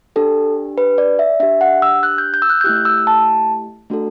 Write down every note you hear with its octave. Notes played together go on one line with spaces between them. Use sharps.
D4 G4 A4
B4
D5
E5
D4 G4 E5
F#5
E6
F#6
G6
G6
E6
F#6
G6
A3 E4 G4 F#6
E6
A5
A3 D4 F#4 A4